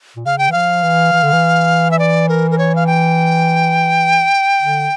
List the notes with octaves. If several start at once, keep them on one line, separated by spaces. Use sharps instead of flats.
A#2
C#3 F5
G5
E3
F3 F5
E3
E3
D3
E3
E5
D5
A#4
A#4
C#5
F5
G5
D3